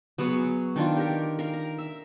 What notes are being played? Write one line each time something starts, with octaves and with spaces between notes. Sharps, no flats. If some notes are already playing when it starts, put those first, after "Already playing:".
F#3 B3 G#4 C#5
D#3 D4 F4
G4 A#4
A#4 F5
A#5
E5